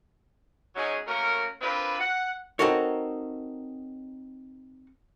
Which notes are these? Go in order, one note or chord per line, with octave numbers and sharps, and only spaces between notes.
F#3 G#3 C#4 D#4 F#4 G#4
A3 A#3 C#4 F#4 A#4
C4 D4 F4 A#4 B4
F#5
C4 D#4 F#4 A4 A#4 C#5